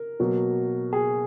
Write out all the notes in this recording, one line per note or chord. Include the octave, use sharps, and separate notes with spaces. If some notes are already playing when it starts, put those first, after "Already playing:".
Already playing: A#4
B2 F#3 A#3
G#4